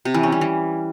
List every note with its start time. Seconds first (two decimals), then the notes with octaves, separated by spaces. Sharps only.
0.05 C3
0.14 E3
0.23 C#4
0.32 G3
0.41 E3